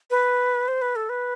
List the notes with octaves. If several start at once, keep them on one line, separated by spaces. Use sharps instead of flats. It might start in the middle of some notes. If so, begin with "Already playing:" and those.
B4
C5
B4
A4
B4